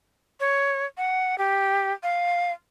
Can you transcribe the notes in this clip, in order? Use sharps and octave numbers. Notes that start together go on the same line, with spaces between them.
C#5
F#5
G4
F5